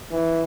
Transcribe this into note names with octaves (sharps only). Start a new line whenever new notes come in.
E3